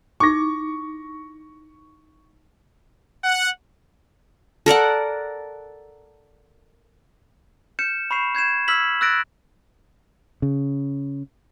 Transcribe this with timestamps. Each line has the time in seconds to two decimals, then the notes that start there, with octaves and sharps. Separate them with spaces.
0.20 D#4 E4 C#6 D6 A#6
3.24 F#5
4.66 A4 A#4 D5 F#5
7.79 F6 G6 C#7 E7
8.11 B5 C#6 G6 C7 E7
8.35 G6 G#6 C7 E7
8.68 E6 F6 G#6 B6 F#7
9.01 E6 F#6 A6 A#6 D7 F#7
10.42 C#3